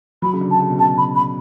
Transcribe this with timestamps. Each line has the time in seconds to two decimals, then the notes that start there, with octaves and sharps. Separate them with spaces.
0.22 F#3 B5
0.33 C#3
0.41 D3
0.50 A5
0.60 C#3
0.70 B2
0.78 C#3 A5
0.98 B5
1.15 B5